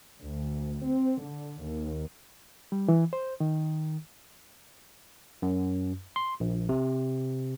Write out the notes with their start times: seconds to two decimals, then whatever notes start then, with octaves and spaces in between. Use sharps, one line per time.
0.21 D2
0.84 C4
1.20 D3
1.61 D#2
2.72 G3
2.88 E3
3.13 C5
3.40 D#3
5.42 F#2
6.16 C6
6.40 A#1
6.69 C3